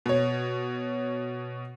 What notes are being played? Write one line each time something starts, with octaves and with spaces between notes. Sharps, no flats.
B2 C#5